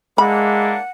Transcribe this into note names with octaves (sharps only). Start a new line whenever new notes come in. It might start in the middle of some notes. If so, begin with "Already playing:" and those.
G#3 A#3 D4 E4 F#5 B5